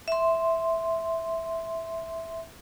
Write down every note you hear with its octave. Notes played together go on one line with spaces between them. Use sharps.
E5 C6